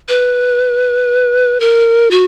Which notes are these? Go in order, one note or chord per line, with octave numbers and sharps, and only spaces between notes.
B4
A#4
F#4